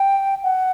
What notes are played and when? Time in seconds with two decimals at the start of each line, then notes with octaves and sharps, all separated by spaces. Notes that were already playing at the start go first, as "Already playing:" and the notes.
Already playing: G5
0.44 F#5